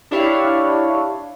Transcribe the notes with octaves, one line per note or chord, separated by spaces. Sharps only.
D4 E4 G4 C#5 F5 B5